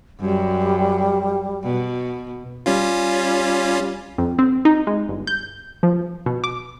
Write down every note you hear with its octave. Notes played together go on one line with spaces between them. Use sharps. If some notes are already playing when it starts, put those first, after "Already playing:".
F#2 G3
B2
G3 C#4 F4
F2
C4
D#4
G#3
G1
G6
F3
B2
D6